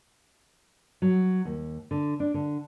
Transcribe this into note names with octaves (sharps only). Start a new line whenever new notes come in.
F#3
D#2
D3
D4
D3